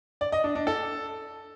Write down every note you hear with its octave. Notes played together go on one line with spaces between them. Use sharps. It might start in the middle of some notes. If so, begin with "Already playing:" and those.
D5
D#5
D4
D4
A4